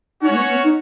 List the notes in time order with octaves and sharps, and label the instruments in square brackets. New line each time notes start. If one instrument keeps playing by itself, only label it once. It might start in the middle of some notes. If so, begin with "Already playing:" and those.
[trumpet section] C#4 F#4 C#5 [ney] D#4
[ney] G#3
B3
B3
D#4